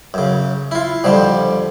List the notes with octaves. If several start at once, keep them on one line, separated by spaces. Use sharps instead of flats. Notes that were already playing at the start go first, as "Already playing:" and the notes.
F#2 C#3
E4 F4
F2 D3 F3 G3